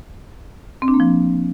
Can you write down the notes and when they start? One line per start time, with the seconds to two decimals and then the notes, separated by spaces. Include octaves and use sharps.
0.82 C4
0.88 D4
0.94 A#3
1.00 F3